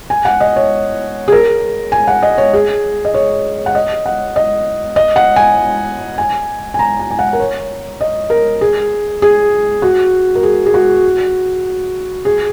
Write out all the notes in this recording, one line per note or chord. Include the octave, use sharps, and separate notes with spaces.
G#5
F#5
D#5
C#5
G#4
A#4
G#5
F#5
D#5
C#5
G#4
D#5
C#5
F#5
D#5
F#5
D#5
D#5
F#5
G#5
G#5
G#5
A#5
G#5
G#5
F#5
A#4
C#5
D#5
A#4
G#4
G#4
F#4
A#4
G#4
G#4
F#4
G#4